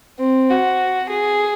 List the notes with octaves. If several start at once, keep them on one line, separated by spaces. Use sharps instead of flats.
C4
F#4
G#4